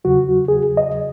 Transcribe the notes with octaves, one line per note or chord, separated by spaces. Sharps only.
E2 C#3 F#3 F#4
G#4
D#5